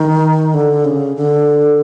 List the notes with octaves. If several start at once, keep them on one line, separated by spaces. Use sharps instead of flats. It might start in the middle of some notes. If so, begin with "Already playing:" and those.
Already playing: D#3
D3
C#3
D3